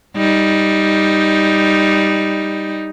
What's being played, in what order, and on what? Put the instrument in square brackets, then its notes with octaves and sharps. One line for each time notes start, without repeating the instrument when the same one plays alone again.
[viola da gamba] G3 D#4